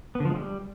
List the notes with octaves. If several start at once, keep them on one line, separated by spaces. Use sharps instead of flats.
B3
D3
F3
G#3
G3